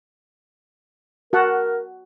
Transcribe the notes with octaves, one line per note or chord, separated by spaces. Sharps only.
F#4 A#4 F#5 A5